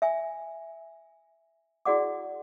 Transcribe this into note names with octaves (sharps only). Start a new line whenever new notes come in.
E5 G#5
E4 F#4 G#4 D5 F#5 D6